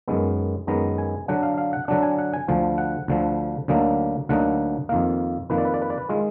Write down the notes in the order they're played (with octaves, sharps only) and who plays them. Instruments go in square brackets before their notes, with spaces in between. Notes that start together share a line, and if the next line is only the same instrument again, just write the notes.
[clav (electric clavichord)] F#2 D#3 G#3 B3
F#2 D#3 G#3 B3 A#5
G#5
D3 F#3 D4 F#5
F5
F5
F#5
D3 F#3 D4 F#5
G#5
F#5
G#5
D2 D3 F3
F#5
D2 D3 F3
D2 D3 F#3 A#3 D#4
D2 D3 F#3 A#3 D#4 F#5
F2 D#3 A#3 F5
F2 D#3 A#3 B4
D5
B4
D5
B4
D5
B4
D#3 G#3 F4